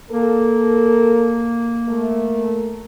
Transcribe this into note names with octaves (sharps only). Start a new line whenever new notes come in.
A#3 A4 A#4
A3 A#4